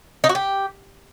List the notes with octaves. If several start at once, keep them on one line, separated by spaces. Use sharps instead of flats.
D#4
F#4
G4